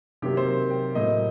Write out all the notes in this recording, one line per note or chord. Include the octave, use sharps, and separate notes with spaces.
C3 D#3 F#3 A#3 G4
C5
A#4
G5
A2 F#3 A#3 D#5